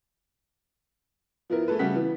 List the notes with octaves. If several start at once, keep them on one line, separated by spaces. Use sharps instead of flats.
F3 B3 E4 A#4
A3 G#4 A4 B4
C#3 G3 A3 F#4 F#5 B6
E3 B3